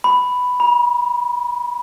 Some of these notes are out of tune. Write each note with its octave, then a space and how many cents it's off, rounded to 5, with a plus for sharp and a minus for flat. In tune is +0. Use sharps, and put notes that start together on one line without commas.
B5 +5
B5 -40